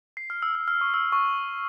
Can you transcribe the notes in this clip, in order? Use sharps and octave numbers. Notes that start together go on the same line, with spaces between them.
C7
F6
E6
E6
F6
C#6
E6
C#6